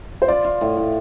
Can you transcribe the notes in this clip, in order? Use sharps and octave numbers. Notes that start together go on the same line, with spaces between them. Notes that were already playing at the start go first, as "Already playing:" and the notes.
C5
F4 D5
F4
A2
A2